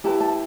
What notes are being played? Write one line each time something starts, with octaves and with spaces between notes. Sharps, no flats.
E4 G4 B4 A5
A5